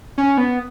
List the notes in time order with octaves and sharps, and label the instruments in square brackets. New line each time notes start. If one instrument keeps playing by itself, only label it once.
[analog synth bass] C#4
B3